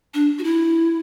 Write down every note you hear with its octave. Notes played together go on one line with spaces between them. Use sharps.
D4
F#4
E4